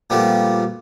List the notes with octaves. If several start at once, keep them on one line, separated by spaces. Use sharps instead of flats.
A#2 F3 G3 A3 B3 C4